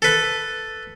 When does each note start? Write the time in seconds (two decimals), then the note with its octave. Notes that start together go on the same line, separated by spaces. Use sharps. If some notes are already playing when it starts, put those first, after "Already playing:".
0.02 A4 B4